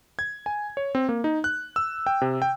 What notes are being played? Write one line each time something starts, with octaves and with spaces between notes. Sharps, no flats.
G#6
G#5
C#5
C4
A#3
D#4
F#6
E6
G5
C3
G5